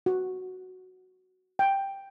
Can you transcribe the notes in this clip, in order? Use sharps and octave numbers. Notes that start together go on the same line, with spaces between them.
F#4
G5